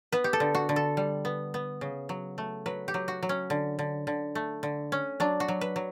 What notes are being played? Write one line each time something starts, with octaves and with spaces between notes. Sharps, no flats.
B3 B4
G4
A4
D3
F#4
D3
A4
G3
B3
B3
C#3
F#3
A3
F#3 B4
G4
F#3
F#4
F#3
C#4
D3
D3
D3
A3
D3
C#4
F#3 D4
F#4
F#3
B4
F#3